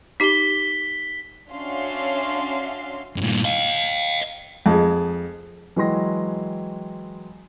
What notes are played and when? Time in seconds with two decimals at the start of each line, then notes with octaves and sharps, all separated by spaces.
0.20 D#4 G4 B6 G7
1.50 C#4 D4 F#4 E5 F5 C6
3.16 G2 A#2
3.44 D#5 F5
4.66 F2 G#3
5.76 E3 F#3 G#3 G5 C6 A#6